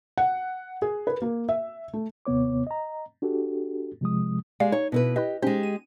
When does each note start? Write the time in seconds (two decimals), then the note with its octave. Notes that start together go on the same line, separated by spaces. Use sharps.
0.18 F#5
0.82 G#4
1.07 B4
1.22 A#3
1.49 E5
1.93 A3
2.26 D#2 C3 B3 C#5 D6
2.67 D#5 A#5
3.22 D4 F#4 G4 A4
4.01 C3 F3 G#3 D#6
4.60 G#3 G4 D5 F5
4.72 D#4 C#5
4.92 B2 E4 B4
5.16 E4 G4 B4 D#5
5.42 G#3 C#4 D#4 G4 C5
5.63 D#7